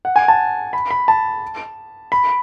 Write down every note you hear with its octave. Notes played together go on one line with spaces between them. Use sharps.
F#5
G#5
A5
B5
B5
A5
B5